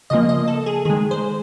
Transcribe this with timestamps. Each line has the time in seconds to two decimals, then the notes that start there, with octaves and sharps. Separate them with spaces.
0.10 C#3 F3 A#3 D#5
0.29 D#5
0.48 A4
0.66 G#4
0.85 D#3 G#3 G#4
1.11 C5